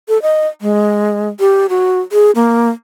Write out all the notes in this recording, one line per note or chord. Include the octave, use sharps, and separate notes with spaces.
A4
D#5
G#3
G4
F#4
G#4
A#3